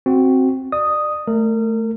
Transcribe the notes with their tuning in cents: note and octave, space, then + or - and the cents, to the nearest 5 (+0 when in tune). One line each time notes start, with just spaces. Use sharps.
C4 +5 F#4 +0
D5 +30 D#6 +0
A3 +0 A#4 -30